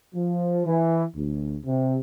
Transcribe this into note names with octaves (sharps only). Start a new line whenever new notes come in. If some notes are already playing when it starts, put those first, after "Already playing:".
F3
E3
D2
C3